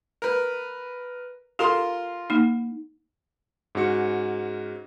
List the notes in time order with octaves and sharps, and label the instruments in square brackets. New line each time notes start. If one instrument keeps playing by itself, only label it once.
[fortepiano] A#4 B4
[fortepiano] F4 A#4 C6 [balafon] G4 A4
[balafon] A#3 D#4
[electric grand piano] G#2 C#4 F#4 C#7